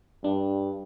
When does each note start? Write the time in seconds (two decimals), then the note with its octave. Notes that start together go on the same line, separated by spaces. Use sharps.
0.24 G2 D4